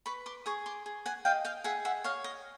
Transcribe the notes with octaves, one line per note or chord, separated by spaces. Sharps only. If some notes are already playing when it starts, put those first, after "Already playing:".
B4 B5 C#6
C6 D6
G#4 C#6 D#6
C6 D6
G#4
F#5 G#5
D#5 F5 G5
F5 G5
G#4 E5 F#5
E5 F#5
C#5 D#5 F5
D#5